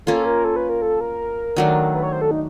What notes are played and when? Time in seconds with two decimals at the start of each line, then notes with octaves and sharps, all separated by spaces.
0.06 A#3 C#4 F4 A4
0.26 A#4
0.44 A4
0.56 B4
0.69 A#4
0.82 A4
1.01 A#4
1.56 D#3 F#3 A3 D4
1.94 B4
2.03 C#5
2.13 C5
2.21 A4
2.31 D#4